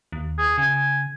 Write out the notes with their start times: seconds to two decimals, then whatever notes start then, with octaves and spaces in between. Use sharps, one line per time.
0.12 D#2
0.38 G#4
0.58 C#3 G#5